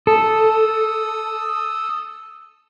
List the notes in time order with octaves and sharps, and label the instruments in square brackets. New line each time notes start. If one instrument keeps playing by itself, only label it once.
[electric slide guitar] A4 [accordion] D#6 E6